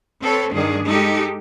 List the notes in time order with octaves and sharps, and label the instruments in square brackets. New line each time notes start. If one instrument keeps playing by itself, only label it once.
[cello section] C4 A4 B4 C#5
G2 D#3 D4 G#4
G#3 D#4 G4 A4